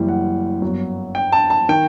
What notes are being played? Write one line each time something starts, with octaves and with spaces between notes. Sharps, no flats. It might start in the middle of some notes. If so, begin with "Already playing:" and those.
Already playing: F#1 F#2 E3 G3
F#5
G1 F#2 F#3
G5
A5
A5
D#3 G5